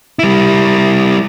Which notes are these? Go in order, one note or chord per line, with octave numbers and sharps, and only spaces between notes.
G3 E4